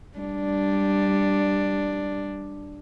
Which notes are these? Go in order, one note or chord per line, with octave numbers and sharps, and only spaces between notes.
G3 D4